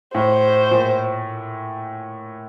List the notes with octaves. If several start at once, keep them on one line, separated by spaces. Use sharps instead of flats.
A2 C5
A#2